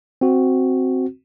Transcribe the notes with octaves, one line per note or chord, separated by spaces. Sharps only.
C4 F#4